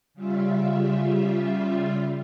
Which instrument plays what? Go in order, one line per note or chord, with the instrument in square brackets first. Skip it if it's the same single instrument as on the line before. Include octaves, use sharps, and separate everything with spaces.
[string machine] C#3 G3 F4 E5